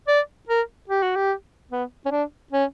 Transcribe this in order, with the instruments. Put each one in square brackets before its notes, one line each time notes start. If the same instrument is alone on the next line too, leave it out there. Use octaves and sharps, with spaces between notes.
[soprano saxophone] D5
A#4
G4
F#4
G4
B3
C#4
D4
C#4